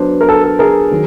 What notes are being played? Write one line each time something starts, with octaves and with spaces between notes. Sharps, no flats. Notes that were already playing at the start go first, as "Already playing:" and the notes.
Already playing: F#3 B3 D4 C5
A#4
A4
A4
G#4 A#4
D#3 F#3